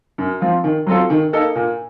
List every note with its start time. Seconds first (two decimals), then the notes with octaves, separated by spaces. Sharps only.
0.18 F#2
0.41 F3 C4 F4
0.64 D#3
0.87 F#3 C4 F4 A4
1.10 D#3
1.33 A#3 D#4 A4
1.56 A#2